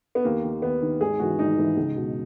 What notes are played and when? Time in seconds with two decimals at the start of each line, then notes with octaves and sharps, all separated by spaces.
0.15 B3
0.25 D#2 A#3
0.44 D#3
0.62 D#2 B3
0.81 D#3
1.01 G#1 G#4
1.19 G#2 E3 F#4
1.39 G#1 D#4
1.58 G#2 E3
1.77 C#2
1.96 B2